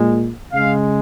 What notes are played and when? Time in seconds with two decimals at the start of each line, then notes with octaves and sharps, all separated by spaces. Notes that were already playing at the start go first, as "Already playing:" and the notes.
Already playing: A#2 G#3
0.52 C#3 G#3 F5